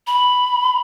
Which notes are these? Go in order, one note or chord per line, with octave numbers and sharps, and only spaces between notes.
B5